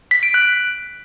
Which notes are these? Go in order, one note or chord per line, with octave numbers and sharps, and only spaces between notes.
B6
D7
F#6